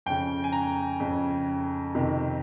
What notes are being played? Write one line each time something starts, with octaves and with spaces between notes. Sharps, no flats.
F2 C#3 G5
G#5
A#5
F2 C#3
F2 C3 D#3